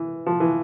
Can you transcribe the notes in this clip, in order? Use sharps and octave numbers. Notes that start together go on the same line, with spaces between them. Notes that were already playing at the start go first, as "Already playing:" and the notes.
Already playing: E3
F3
E3